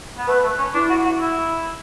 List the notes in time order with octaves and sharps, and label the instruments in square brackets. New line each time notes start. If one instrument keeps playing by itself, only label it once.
[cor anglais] B3
[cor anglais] A3 [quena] B4
[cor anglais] A3
C#4
[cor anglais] D4 [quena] E4
[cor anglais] F#4
F#4
E4